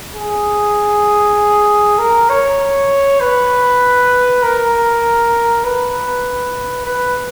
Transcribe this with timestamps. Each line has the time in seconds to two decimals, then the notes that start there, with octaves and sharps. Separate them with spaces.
0.16 G#4
1.99 A#4
2.29 C#5
3.20 B4
4.43 A#4
5.64 B4
6.85 B4